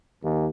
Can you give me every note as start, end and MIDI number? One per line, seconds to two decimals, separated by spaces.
0.23 0.46 39